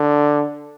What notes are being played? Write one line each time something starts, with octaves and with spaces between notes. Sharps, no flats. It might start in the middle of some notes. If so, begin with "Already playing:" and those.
Already playing: D3